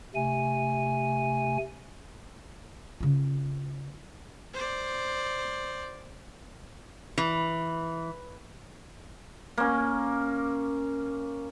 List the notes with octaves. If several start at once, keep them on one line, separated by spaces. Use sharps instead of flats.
C3 A3 G#5
C#3 F4
C5 D5
E3
A#3 C#4